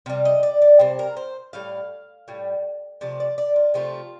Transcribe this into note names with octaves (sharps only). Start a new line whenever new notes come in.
C3 G3 F5
D#5
D5
D5
C3 G3 C5
A#4
C5
A2 G3 F5
A2 G3
C3 F3 A3 D5
D5
D5
F4
C3 F3 A3 F4